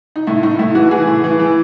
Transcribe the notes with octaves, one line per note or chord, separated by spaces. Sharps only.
D#4
A2 E4
A2 D#4
A2 E4
E3 F#4
E3 G#4
A2
E3
E3